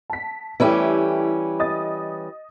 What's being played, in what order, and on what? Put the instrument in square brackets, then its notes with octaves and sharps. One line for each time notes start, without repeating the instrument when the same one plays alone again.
[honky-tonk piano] A5 B6
[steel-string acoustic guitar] E3 G3 C#4 [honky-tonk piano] A3 E4 G4
[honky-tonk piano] D#5 D#6 A6